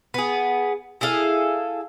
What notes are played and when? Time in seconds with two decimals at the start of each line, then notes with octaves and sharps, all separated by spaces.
0.14 B3 G#4
1.01 E4 G#4 A4 F5